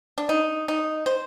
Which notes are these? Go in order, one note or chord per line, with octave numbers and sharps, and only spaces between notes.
D4
D#4
D#4
C5